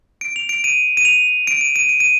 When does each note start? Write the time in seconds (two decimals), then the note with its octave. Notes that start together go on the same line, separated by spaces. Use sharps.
0.21 D7
0.36 F7
0.49 D7
0.64 D#7
0.97 D#7
1.05 F7
1.47 D7
1.61 D#7
1.76 D#7
1.89 D7
2.00 D#7